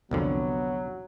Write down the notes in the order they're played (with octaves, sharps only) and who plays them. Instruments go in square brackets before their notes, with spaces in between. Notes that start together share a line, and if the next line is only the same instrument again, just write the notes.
[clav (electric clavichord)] C2 F2 D3 [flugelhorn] F#3 [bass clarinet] B3